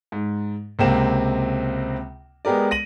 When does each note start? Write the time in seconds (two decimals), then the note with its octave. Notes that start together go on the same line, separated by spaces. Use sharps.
0.12 G#2
0.79 C#2 C3 A#3 C4 E7
2.45 G#3 B3 G4 A#4 D5
2.71 A#6 D#7 F#7